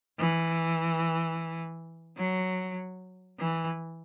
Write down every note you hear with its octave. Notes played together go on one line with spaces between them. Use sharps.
E3
F#3
E3